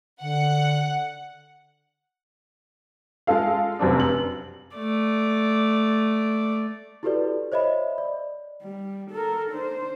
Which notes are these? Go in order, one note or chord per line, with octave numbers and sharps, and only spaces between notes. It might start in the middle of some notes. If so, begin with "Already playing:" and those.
D3 F#5
G#3 F4 A4 F5
F1 F#2 C4 D4
F#7
A3 D5
E4 F#4 G4 A4 B4 D5
C5 C#5 D#5 E5 B5
D5
G3
A4 A#4
D4 C5